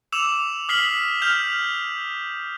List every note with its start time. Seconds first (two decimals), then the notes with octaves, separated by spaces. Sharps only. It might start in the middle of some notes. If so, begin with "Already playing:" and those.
0.12 D6 E6 E7 F7
0.69 D#6 F6 B6 C7 F#7
1.22 F6 G6 F7